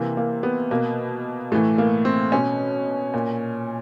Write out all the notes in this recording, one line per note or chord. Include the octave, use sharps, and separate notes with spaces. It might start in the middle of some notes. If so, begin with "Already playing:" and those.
Already playing: C3 E3 A#3
A#3
B3
B2 A#3
A2 E3 A3
A#3
C4
B2 C#4
A#2